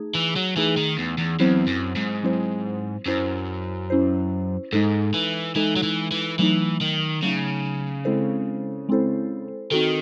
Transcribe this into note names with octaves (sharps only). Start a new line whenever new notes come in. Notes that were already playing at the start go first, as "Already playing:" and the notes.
Already playing: A3 D#4 G#4
E3
F#3
E3 A3 D#4 G#4
D#3
E2
E2
E2 F#3 C4 E4 C5
F#2
G#2
F#3 C4 E4 C5
F#2 C#4 E4 C5
C#4 E4 C5
G#2 G#3 D#4 A4
E3
E3 G#3 D#4 A4
F#3
E3
E3
E3 F#3 A3 D#4
D#3
C#3 F#3 A3 D#4
G#3 C4 E4 A4 C5
G#3 C4 E4 A4 C5
D#3 C4 D#4 F#4 A4